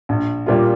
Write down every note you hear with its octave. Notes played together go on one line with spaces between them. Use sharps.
A#1
A#2 G3 A#3 F4